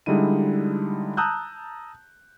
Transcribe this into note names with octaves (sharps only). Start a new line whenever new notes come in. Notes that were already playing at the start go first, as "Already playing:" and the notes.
D3 G3 G#3 D#4 E4 D#7
A5 A#5 D#6 E6 F#6 G6